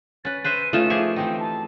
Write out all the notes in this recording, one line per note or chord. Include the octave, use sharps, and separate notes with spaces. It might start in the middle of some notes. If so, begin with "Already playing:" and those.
C#4 B4 A6
B4 C5 E5 D#7
A3 C#4 D#4 F4 E7
F3 G4 G#4 C#6
E3 C4 D#4 G5
A5